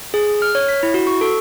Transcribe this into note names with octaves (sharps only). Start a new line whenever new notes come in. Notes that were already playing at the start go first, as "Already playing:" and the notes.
G#4
F6
C#5
B6
E4
F#4
C#6
A4